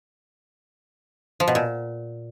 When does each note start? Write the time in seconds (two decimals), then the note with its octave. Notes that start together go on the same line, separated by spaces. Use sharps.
1.40 F3
1.48 B2
1.55 A#2